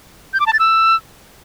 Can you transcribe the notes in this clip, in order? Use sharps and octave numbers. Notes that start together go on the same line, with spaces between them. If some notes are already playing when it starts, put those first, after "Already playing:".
G6
D6
A5
A6
E6